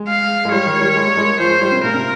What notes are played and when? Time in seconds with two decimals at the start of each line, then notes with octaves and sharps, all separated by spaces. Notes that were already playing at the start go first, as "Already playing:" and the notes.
Already playing: G#3
0.08 F5
0.45 G#3
0.52 G3 C#5
0.66 D#3
0.81 G3
0.96 G#3
1.07 A#3
1.17 G#3
1.39 F3 C5
1.50 G#3
1.62 G3
1.72 C3
1.83 A#2 A#4
1.94 C3